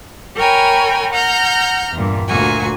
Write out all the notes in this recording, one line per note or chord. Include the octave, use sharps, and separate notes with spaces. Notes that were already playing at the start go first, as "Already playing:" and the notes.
A#4 C#5 G5 G#5 A#5 B5
F#5 A#5 F6 G6
E2 G2 A#2
D2 A#2 F#4 G#5